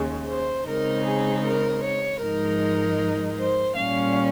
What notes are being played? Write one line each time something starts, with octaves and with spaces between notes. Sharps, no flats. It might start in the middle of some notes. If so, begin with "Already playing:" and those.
Already playing: D#2 C#3 G#3
C5
C#3 G#3 C4 D#4 A#4
G#4
A#4
C#5
G#2 F3 G#3 D#4 A#4
C5
A#2 G3 C#4 F5